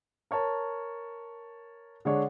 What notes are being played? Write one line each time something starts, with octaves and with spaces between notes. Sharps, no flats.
A#4 C#5 A5
D3 G#3 D4 C#5